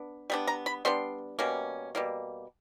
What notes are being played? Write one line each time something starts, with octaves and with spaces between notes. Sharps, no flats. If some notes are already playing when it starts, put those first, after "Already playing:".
Already playing: B3 D4
G3 B3 D4
A#5
B5
G3 B3 D4 C6
B2 G3 A#3 C#4
B2 G3 A#3